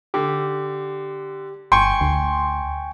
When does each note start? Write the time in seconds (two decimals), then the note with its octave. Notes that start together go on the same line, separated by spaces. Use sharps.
0.14 D3 G4
1.72 G1 G5 G#5 C6 C#6
2.01 D2